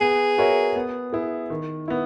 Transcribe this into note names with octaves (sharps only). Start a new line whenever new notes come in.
B3 G#4
F#4 A#4 C#5 E5
B3
E4 G#4
D#3
B3 E4